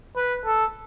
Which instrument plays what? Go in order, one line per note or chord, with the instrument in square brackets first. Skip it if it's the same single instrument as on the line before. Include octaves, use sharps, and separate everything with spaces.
[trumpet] B4
A4